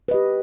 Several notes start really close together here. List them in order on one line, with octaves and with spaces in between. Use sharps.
B4 D#5 G4